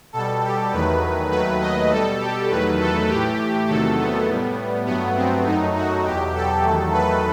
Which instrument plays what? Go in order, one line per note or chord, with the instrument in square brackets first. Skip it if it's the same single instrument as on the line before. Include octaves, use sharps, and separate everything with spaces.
[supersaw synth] B2 G3 A4
G4
E2 D#3 F#3 A3 B4
D#2 D#3 F#3 A3 B4
D#5
B2 G3 A4
G4
E2 D#3 F#3 A3 B4
A4
A2 E3 A3 G4
E2 C3 D#3 F#3 A3 A4
B3
A2 G3
G2 F#3 A3 B3
C4
F#2 F#3 A3 D#4
F#4
E2 B2 F#3 G4
A4
E2 D#3 F#3 A3
B4